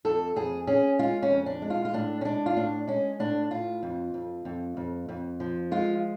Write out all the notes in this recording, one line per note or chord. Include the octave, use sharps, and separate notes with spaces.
F2 A4
F2 G#4
C#4 G#4
G#3 F4
C#4
F2
D4
G#3
F4
F4
A2 D4
C#4
G#3 D4
F4
A2 D4
G#3 C#4
A2 D4
A2 F4
F2
F2
F2
F2
F2
F3
G#3 F4